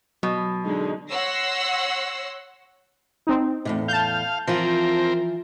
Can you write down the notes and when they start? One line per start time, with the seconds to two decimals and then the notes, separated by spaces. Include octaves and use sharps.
0.23 B2 F#3
0.64 D3 G#3 D#4
1.10 C#5 F#5 C6 E6 A#6 C7
3.27 C4 D#4
3.65 E2 A2 C3
3.88 F5 A5 G6
4.47 E3 F3 C4 F4 A#4